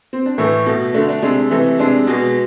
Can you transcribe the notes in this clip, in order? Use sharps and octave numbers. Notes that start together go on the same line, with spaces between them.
C4
D4
A2 E3 A3 E4
B2 A3
D3 A3 D4
D4
C3 G#3 D4
C3 E3 A3
C3 G#3 D4
B2 G#3